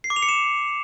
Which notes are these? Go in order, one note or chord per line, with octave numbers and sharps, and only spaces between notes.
C7
D6
F7
C#7
E7